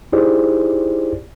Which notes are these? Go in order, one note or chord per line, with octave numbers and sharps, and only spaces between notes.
D#4 E4 G4 G#4 C5 D5